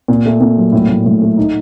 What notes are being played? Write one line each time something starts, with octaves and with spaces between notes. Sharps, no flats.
A#2
A3
A#2
F#3
A2
A2
A2
A3
D#4